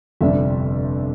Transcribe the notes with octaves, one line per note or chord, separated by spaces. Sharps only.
G1 F2 C3 G3 D4 E5